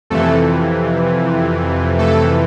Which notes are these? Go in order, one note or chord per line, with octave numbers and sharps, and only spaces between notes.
F2 C3 E3 A3 A4
A3 A4